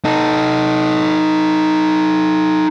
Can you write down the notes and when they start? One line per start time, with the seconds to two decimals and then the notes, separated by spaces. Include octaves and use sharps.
0.05 D#4 A4